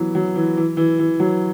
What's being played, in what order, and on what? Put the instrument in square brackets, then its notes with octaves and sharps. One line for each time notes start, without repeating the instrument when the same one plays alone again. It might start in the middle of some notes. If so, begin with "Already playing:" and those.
Already playing: [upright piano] E3 F#3 B3
F#3
E3
E3
E3
E3
F#3